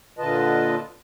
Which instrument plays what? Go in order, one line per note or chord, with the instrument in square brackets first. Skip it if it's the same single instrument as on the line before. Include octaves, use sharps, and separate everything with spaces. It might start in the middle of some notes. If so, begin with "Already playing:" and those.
[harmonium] A#2 D3 F4 B4 D#5 A5